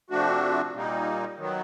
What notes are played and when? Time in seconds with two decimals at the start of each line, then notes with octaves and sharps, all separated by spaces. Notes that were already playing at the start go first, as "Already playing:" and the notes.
0.10 C3 F3 A3 D4 F#4
0.73 A#2 G3 A#3 D#4
1.38 D#3 F#3 B3